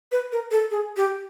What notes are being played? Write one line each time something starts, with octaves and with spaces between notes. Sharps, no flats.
B4
A#4
A4
G#4
G4